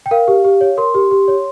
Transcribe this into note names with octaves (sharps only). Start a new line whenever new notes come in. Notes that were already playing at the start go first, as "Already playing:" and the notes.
G5
A#4 F5
G4
G4
C#5
A#4 C6
G4
G4
C#5